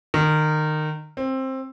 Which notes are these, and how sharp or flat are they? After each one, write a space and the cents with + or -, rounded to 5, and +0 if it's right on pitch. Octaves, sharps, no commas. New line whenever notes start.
D#3 -20
C4 +15